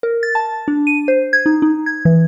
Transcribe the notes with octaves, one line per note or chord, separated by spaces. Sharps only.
A#4
A6
A5
D4
D#7
C5
G#6
D#4
D#4
G#6
E3